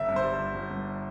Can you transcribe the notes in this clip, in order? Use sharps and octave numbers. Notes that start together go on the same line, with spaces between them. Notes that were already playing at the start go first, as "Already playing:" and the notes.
Already playing: G1 E5
G2
C5
G3
G1
G1
G2